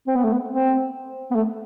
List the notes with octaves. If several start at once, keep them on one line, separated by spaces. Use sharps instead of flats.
C4
B3
A3
B3
C4
B3
A3